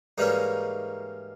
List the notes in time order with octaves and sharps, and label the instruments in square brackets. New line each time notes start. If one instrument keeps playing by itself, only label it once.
[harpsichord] G#2 E3 G3 A#3 C#4 D#4